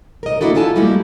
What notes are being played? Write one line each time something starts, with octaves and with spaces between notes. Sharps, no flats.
A#4 D#5
A#3 D4 E4 F#4 A4
E4 F4 A4 G#5 A5
G3 G#3 A#3 E4 F#4